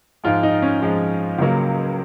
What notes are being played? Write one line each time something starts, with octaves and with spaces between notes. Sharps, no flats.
G#2 F3 G#3 F4
D#4
C#4
G#2 F3 G#3
C#2 C#3 F#3 A#3